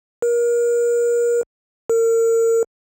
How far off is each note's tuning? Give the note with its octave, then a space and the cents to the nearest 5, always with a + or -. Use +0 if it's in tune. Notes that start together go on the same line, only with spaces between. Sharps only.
A#4 +30
A#4 -35